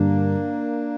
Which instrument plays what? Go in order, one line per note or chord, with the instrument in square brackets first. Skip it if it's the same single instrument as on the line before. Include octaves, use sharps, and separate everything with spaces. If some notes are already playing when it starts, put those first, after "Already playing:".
Already playing: [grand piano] G2 D3 G3 [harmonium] A#3 D4